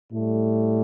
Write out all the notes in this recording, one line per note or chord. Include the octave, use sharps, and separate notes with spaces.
A2 G3 A3